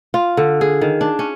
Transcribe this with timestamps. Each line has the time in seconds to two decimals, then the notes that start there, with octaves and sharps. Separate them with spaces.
0.14 F4
0.37 D3
0.61 G#4
0.81 D#3
1.01 D4
1.19 C#4